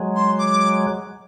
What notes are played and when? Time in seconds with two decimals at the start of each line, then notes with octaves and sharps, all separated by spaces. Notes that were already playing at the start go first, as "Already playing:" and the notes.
Already playing: F#3 G#3
0.16 C6
0.38 D6